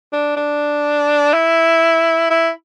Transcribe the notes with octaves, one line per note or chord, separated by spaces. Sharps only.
D4
D4
E4
E4